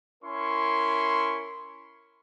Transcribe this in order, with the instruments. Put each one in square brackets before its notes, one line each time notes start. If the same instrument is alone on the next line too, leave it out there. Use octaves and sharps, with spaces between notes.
[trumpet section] C#4 E4 A#4 C6 C#6